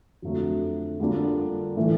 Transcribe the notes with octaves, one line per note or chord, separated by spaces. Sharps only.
F2 D3 F#3 A3
D3 G3 A#3 D4 F4
A2 E3 A3